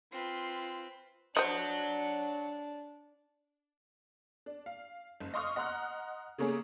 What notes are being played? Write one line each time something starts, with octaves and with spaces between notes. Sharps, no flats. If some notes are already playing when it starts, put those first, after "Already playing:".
C4 F4 B4 C6
D4 C5 C#5 D#5 F#5
D4
F5
F#1
D#5 F5 C6 C#6 D#6 F6
D#5 F#5 A#5 C6 F6 F#6
C#3 A3 A#3 C#4 G#4